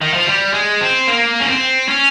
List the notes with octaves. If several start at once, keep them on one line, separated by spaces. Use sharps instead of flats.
D#3
F3
G3
G#3
C4
A#3
C#4
C4
C#4